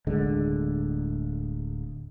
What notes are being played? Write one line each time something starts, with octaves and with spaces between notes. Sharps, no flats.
D1 D3 G#3